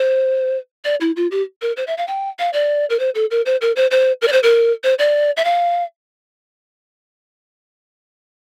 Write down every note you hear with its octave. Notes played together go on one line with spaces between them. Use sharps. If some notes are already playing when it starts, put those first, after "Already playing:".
Already playing: C5
D5
E4
F4
G4
A#4
C5
E5
F5
G5
F5
D5
A#4
C5
A4
A#4
C5
A#4
C5
C5
A#4
D5
C5
A#4
C5
D5
E5
F5